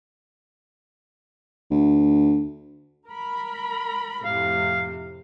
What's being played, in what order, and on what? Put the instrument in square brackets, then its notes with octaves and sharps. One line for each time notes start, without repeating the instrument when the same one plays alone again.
[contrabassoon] D2
[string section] A#4 B5
[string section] F2 A2 C3 [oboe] F5